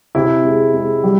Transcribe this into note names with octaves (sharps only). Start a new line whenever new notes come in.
C3 E4
G#3
G#3
G3